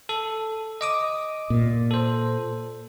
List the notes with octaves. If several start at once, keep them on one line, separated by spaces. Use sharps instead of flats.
A4
D#5 D6 D#6
A#2
A4 C5